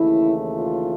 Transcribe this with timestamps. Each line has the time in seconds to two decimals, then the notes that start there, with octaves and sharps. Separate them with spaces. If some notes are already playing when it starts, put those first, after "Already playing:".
Already playing: D#2 C#3 E3 A3 E4
0.55 F4